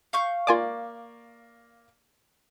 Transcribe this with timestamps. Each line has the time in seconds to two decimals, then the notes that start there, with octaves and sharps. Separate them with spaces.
0.13 F5 C#6 G6
0.47 A#3 F4 D5 G#5 D6